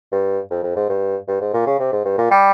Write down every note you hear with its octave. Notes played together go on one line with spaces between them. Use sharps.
G2
F2
F2
G#2
G2
G2
G#2
A#2
C#3
C3
G#2
G2
A#2
G3